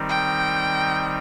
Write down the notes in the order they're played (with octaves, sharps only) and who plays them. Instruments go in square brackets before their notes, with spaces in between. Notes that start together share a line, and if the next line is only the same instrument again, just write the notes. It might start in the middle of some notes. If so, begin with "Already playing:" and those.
Already playing: [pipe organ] D#3 G3 C4 D#4
[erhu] G5